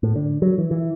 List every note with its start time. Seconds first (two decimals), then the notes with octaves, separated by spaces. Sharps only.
0.03 A2
0.16 D3
0.42 F#3
0.58 E3
0.71 E3